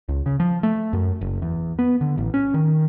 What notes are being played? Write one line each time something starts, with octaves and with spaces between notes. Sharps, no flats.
C#2
C#3
F3
A3
F#2
F#1
E2
B3
D3
A1
C#4
D#3